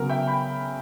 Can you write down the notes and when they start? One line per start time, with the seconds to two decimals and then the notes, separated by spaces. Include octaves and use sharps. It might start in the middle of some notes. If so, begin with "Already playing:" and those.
Already playing: C#3 F#3 B3 A#4
0.09 E5 G5
0.27 G5 B5